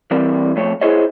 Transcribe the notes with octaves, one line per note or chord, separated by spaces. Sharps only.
E3 G3 C4 A#4 D5
F2 A3 C#5
E4 G#4 C5 C#5 D#5